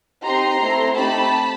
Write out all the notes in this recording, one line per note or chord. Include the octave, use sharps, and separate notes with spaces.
C4 D#4 G4 A#5 C6
A3 C4 E4
A3 C4 D#4 G4 A5 B5